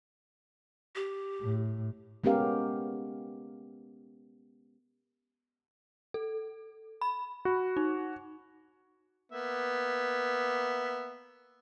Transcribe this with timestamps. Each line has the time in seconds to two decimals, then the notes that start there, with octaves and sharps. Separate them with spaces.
0.95 G4
1.41 A2
2.24 G#3 B3 C#4 G4 A#4 F5
6.14 A4
7.01 B5
7.45 F#4
7.77 D#4
9.32 A#3 B3 E5